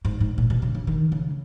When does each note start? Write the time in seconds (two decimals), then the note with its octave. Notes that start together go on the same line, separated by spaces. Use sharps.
0.05 G#2
0.20 G#2
0.38 A#2
0.50 B2
0.62 C#3
0.75 C#3
0.87 D#3
1.12 C#3